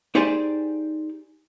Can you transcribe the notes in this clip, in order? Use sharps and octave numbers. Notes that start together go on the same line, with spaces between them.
D#4 G4 G#4 C5 D5 G#5